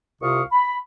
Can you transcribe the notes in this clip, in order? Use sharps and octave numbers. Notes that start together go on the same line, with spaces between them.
C2 C3 F4 F5 C#6 D#6
B5